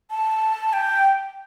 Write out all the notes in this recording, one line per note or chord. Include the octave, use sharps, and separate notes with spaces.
A5
G5